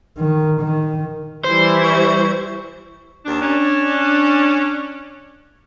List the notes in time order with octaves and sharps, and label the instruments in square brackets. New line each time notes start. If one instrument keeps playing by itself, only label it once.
[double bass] D#3
D#3
[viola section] E3 G3 E4 [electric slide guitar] C5
[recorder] C#6
[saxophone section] D#2 D4
C#4 D4